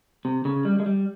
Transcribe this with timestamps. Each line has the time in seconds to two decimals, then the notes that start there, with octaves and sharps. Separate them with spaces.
0.25 C3
0.45 C#3
0.65 G3
0.80 G#3
0.86 G3